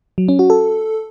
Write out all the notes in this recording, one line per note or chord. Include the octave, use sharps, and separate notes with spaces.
F#3
C#4
F#4
A4